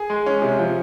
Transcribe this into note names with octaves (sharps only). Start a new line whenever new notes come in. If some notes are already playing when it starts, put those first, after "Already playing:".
Already playing: G#4
G#3
C#4
C3
F3